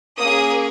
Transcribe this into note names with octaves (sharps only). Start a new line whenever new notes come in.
A#3 C#4 G#4 D#6